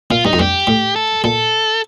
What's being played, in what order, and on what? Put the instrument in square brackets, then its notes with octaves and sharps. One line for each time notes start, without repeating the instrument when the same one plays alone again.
[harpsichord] A#2 [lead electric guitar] F4
[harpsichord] G2 [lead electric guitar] D#4
[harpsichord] F2
[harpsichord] G2 [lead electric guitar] G4
[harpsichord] A2
[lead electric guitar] A4
[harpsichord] A#2 [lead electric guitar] A4